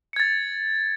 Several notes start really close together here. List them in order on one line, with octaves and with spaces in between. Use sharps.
C#7 G#6 A6